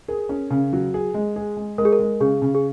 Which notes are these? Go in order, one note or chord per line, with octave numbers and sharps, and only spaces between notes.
G#4 A#4
C#4
C#3
F#3
G#4
G#3
G#4
G#3
G#3 A#4
G#4
A#4
G#3
C#3 G#4
C#3
G#4